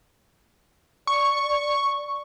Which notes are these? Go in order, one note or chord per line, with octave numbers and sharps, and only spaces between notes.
D5 C#6